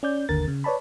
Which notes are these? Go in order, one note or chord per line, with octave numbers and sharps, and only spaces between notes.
C#4 D5 G6
G1 D#2 D3 A#4 A6
C#3
B4 C#5 D5 A5 B5